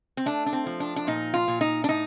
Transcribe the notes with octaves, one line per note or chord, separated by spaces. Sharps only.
C4
A3 D4
D4
C4
F3
D4
D4
A#2 D#4
F4
A#2
D#4
D4
A2 D#4